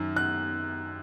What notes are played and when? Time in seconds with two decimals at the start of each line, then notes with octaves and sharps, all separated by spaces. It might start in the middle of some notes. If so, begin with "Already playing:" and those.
Already playing: F#2 D#3
0.16 F#6